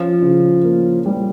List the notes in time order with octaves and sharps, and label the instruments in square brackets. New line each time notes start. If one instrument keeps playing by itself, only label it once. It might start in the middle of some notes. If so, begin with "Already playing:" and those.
Already playing: [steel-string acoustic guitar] F3 [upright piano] C#4
[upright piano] C#3
A#3
G3